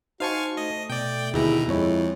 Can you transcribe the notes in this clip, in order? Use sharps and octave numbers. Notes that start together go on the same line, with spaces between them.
D#4 F#4 C5 F5 G#5 A5 C#6
A3 D#5
B2 D5 G5
D#2 B2 D3 E4 G#4 A#5
F2 G#3 C4 E4 C#5